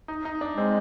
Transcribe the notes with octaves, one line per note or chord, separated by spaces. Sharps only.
D#4
D#4
D4
G#3 C4